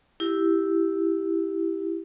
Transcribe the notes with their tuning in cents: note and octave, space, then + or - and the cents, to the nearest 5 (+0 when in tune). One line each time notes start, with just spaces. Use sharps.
E4 +0 G4 +0